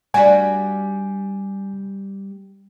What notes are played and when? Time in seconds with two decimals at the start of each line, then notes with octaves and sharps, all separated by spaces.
0.14 G3 D4 F#4 G#5